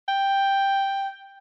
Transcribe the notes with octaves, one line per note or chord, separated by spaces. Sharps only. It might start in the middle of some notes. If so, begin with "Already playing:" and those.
G5